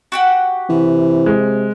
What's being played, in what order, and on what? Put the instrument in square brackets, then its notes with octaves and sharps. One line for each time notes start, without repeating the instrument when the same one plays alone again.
[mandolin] F#4 G4 F#5
[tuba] C3 [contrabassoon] E3
[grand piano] G#3